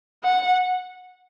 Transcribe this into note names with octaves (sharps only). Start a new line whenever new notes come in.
F#5